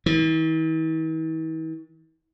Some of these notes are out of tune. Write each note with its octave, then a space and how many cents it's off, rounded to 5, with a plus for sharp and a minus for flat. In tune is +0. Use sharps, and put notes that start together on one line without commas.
E3 -45